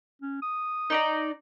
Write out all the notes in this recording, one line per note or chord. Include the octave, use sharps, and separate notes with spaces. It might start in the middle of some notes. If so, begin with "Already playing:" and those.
C#4
D#6
D#4 D5 A#5